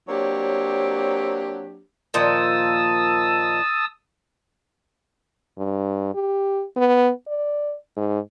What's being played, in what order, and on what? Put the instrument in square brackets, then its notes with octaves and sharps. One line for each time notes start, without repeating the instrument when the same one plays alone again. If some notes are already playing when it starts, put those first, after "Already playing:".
[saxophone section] F#3 A#3 C4 D4 G4 C#5
[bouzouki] A#2 D#3 F3 [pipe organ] A5 D#6 E6
[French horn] G2
G4
B3
D5
G#2